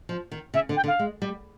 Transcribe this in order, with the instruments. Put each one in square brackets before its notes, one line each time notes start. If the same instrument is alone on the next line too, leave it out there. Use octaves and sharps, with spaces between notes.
[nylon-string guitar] F3
D#3
[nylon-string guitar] C#3 [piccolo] E5
[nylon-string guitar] D3
[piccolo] G5
[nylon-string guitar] D3
[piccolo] F5
[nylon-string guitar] G#3
G3